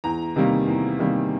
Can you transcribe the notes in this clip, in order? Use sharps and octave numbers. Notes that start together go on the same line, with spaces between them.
E2 A#5
C3 D#3 G3 A#3
E2
C3 D#3 G3 A#3